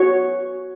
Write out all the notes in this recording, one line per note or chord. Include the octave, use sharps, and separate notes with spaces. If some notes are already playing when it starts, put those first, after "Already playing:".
Already playing: F#4 C#5